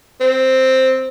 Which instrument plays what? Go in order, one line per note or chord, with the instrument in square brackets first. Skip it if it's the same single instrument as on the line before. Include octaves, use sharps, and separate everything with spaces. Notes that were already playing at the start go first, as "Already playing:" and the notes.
[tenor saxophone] C4